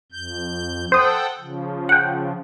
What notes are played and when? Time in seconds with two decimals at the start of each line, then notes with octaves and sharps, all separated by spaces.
0.12 F2 G6
0.92 A4 C5 F#5 G5 D#6
1.39 C#3 F3
1.89 F#5 G5